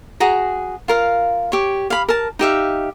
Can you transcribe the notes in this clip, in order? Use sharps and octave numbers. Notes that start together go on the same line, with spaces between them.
F#4 G#4 A#5
F4 A#4 F5
G4 C#5
F5 B5
A#4 A5
D#4 G4 E5 F5